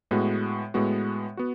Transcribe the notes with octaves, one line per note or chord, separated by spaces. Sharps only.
A2 G#3 B3 F#4
A2 G#3 B3 F#4
B3 F#4